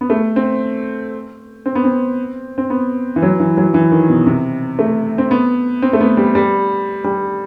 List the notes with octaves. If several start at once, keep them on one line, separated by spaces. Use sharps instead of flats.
B3
A3
C4
C4
B3
C4
C4
B3
E3
F#3
E3
F#3
E3
D#3
B2
C3
A3
C4
B3
C4
A3
B3
G3
G3
G3